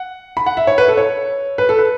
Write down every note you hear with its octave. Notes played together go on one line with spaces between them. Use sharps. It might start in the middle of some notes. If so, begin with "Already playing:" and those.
Already playing: F#5
B5
F#5
E5
C#5
B4
A4
C#5
B4
A4
B4